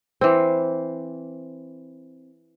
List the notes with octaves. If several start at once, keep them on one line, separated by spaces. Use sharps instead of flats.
E3 C4